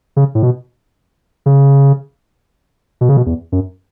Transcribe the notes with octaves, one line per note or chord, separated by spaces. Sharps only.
C#3
A2
B2
C#3
B2
C#3
B2
E2
F#2